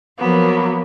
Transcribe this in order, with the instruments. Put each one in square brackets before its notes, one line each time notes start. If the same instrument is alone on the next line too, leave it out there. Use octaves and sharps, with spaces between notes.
[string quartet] F3 F#3 A#3 B3